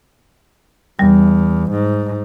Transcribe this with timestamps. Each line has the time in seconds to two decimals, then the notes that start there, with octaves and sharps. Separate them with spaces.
0.99 E2 G3
1.71 G#2